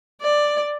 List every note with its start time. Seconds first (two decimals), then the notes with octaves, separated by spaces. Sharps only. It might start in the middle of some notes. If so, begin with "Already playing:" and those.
0.21 D5